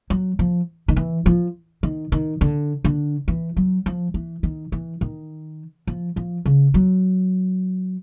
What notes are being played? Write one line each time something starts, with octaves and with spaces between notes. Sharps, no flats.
F#3
F3
D#3
E3
F3
D#3
D#3
D3
D3
E3
F#3
F3
E3
D#3
E3
D#3
F3
F3
C#3
F#3